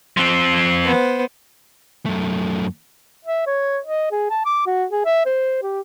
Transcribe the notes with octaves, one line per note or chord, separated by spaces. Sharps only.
F3 C4
B3 C5
F#2 A3
E5
C#5
D#5
G#4
A5
D6
F#4
G#4
E5
C5
G4